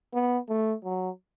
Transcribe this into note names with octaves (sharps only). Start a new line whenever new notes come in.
B3
A3
F#3